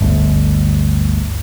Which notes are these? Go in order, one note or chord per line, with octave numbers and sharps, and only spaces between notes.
G1 D2